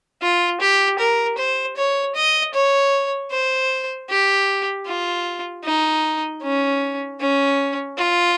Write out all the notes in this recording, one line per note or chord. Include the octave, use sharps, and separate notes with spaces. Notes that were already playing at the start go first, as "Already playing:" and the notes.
F4
G4
A#4
C5
C#5
D#5
C#5
C5
G4
F4
D#4
C#4
C#4
F4